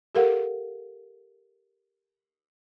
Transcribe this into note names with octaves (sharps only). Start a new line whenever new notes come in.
G4 A4 A#4 F5 F#5